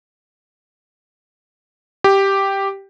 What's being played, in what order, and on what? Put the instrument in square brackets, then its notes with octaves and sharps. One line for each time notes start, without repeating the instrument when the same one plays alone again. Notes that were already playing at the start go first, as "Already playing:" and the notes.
[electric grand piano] G4